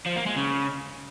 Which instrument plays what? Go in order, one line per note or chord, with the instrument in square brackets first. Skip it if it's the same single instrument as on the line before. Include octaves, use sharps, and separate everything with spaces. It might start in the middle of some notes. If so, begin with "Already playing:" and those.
[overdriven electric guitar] F3
A#3
G#3
C#3